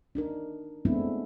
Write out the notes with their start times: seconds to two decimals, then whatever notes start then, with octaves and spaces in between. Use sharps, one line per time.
0.15 D4 D#4 A#4
0.85 G#3 A3 B3 C4 D4 E4